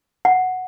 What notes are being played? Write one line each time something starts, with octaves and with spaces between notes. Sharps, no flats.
F#5